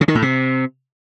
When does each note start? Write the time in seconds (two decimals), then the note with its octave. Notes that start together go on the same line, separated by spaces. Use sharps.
0.01 C#3
0.08 D#3
0.15 A2
0.22 C3